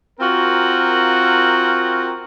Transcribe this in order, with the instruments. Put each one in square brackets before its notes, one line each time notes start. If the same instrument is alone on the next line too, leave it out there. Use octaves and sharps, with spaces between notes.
[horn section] C4 F4 F#4 A#4